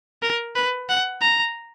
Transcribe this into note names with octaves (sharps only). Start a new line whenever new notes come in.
A#4
B4
F#5
A#5